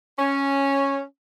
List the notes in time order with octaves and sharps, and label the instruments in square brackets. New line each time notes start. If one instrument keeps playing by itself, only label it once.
[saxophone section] C#4